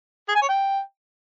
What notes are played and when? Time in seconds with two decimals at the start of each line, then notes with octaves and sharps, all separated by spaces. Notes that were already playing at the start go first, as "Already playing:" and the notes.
0.29 G#4
0.35 G#5
0.42 C#5
0.49 G5